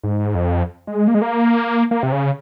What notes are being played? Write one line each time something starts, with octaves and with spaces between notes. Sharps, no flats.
G#2
F2
G#3
A#3
G#3
A#3
A#3
C3
C#3